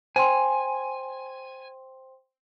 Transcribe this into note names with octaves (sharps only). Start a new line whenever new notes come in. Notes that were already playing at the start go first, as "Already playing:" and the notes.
C5 G5 G#5 C6